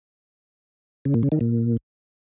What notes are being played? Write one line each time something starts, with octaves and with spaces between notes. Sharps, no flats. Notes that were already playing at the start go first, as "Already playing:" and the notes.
C#3
A#2
C#3
D#3
A#2